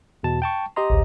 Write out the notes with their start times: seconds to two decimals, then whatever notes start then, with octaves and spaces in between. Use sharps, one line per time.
0.23 E2 B2 A5
0.42 G5 A5 C#6
0.76 G4 D#5 A#5 C6
0.90 A1 D2